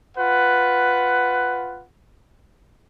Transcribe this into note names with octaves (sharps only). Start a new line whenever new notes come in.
F4 B4 F#5